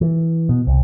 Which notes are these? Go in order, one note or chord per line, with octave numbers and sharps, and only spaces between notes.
E3
B2
C2